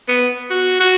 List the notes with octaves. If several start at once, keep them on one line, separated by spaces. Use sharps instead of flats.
B3
F#4
F#4